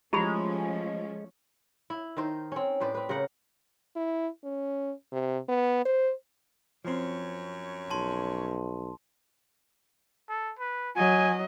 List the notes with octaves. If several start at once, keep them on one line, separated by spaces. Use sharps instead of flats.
F3 G#3 A3 C#4 E4 G4 B5
E4
D#3 D#4 C5
C4 C#4
A2 B4 C5 D5
C4 B4
C#3 A#4 C5 F#5
E4
C#4
C3
B3
C5
F#2 F3 C4 C#5
B1 A5 C6
A4
B4
F#3 D#5 G#5